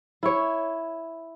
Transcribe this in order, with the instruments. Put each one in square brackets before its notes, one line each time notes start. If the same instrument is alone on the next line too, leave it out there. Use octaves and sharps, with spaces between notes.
[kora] E4 C#5